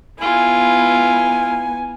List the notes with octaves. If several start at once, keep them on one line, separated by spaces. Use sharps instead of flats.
B3 E4 F4 G#5